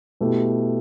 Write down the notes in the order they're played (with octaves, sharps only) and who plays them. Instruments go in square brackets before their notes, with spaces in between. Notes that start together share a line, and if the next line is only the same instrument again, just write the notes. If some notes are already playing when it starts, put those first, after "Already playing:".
[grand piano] B2 A3 E4 G4